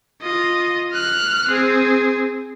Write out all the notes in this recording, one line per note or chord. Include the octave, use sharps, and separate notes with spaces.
F4 D#5
F6 F#6
C4 G#4